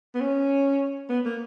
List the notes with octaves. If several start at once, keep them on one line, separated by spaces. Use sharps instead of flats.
B3
C#4
B3
A#3